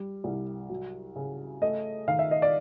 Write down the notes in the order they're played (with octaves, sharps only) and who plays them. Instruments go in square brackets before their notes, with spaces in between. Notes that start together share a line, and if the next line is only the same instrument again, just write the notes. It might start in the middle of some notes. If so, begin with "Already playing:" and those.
Already playing: [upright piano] G3
C2
F#3
C#3
A3 D#5
D#3 F5
E5
D#5
D5